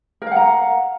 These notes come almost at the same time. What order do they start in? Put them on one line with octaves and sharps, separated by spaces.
A#4 F5 F#5 A#5